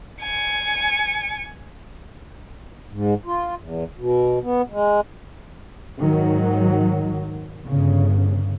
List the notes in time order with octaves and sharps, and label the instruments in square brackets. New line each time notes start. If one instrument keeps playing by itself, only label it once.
[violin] G#5 C#7
[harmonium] G#2
F4
E2
B2
B3
G#3
[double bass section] G#2 D#3 F#3
G1 C#3